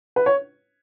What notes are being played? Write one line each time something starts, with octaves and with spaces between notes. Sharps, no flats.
B4
C#5